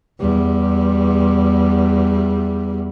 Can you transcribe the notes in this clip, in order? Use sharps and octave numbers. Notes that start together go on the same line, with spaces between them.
E2 G3